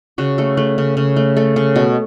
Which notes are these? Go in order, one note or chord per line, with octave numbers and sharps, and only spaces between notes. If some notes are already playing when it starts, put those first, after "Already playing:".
C#3 F#4
A3 A4
A3 B4
C#3
C#3
A3
A3 A4
C#3
B2